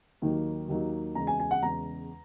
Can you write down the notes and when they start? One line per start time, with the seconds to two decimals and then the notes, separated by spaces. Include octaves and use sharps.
0.22 D#2 D#3 F#3 A#3 D#4
0.68 D#2 D#3 F#3 A#3 D#4
1.15 E2 C#3 G#3 A#5
1.27 G#5
1.40 G#5
1.51 F#5
1.62 E2 C#3 G#3 A#5